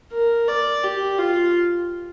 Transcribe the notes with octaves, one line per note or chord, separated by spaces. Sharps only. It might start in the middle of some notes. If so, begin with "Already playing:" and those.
A#4
D5
G4
F4